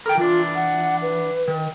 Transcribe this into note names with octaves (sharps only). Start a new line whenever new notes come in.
A4 A#4 G5
E3 D4 F4
F#5
B4
D#3